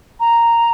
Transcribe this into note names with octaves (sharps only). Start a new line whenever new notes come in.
A#5